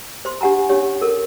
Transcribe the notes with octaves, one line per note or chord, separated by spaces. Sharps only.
C5 C6
D4 G4 F#5 G#5 A#5
C#4 D4 G4 C#5
A4 A#4